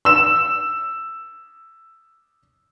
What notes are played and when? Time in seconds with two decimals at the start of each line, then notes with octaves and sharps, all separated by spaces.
0.05 E6 E7